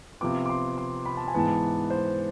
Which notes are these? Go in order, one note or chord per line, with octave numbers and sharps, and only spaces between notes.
C3 F3 B3 D6
D6
C6
C6
B5
A5
G#5
G#2 E3 B3 A5
C5